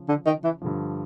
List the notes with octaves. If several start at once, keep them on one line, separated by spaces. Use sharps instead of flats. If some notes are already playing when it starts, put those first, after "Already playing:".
Already playing: C#3 F3
D3
D#3
E3
G2 D3 F3